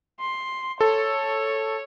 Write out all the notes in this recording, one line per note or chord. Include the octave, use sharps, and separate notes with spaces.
C6
A4 C#5